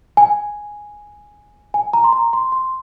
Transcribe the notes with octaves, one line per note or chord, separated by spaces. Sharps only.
G#5
G#5
A#5
C6
A#5
C6
C6